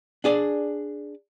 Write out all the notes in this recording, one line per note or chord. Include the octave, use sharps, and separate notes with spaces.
D4 G#4 D5